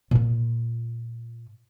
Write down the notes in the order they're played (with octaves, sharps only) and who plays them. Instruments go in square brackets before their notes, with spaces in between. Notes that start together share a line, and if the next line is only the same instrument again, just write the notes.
[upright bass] A#2 F4